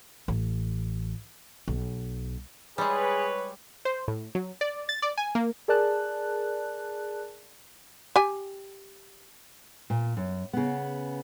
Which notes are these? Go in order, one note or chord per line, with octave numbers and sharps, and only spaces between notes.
A1
B1
G3 G#3 G#4 B4 C#5
C5
A2
F#3
D5
A6
D5
G#5
A#3
G#4 A#4 D5 A5 F#6
G4 G#5
A#2
F#2
C#3 B3